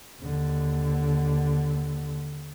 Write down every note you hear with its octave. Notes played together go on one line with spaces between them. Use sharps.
D#2 D3